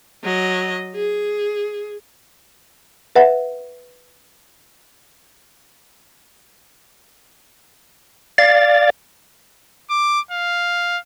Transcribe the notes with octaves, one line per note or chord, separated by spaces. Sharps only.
F#3 D#5
G#4
B4 E5 F#5
D5 F5 A6
D6
F5